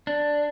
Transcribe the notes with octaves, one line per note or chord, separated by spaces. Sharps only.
D4